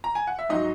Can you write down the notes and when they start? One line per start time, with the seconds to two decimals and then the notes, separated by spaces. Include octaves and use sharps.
0.04 A#5
0.15 G#5
0.27 F#5
0.39 E5
0.49 G#2 F#3 D#4 D#5